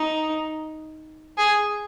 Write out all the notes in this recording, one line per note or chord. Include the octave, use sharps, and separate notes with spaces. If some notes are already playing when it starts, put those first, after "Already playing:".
Already playing: D#4
G#4